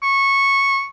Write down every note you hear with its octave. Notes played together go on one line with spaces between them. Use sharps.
C#6